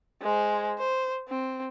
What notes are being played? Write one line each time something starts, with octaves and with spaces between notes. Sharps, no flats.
G#3 C5
C5
C4